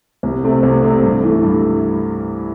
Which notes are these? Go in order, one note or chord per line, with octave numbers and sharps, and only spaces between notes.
C2
C3 A3 C4
C2
C3 A3 C4
G2
E3 A3
G2